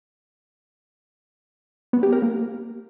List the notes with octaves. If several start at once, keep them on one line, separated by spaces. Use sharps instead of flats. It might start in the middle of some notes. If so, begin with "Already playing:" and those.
B3
G4
A#4
A#3